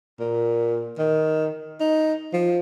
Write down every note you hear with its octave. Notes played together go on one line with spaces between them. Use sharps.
A#2
D#3
D#4
F3